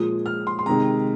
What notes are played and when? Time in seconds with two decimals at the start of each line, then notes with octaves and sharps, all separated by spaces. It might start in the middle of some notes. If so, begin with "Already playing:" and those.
Already playing: A#2 F3 G#3 D#6
0.26 F6
0.47 C6
0.59 C6
0.66 C3 D#3 G#3 A#5